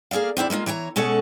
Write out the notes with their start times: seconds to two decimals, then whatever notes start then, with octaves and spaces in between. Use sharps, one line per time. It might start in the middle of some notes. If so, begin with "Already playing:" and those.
0.11 A#3 G#4 A4 D5 F5
0.37 E2 C4 E4 D5
0.50 G#3 A#3 C#4 F4
0.66 E3 C#5 G5 A#5
0.96 B2 G#3 C#4 A4 C#5 F#5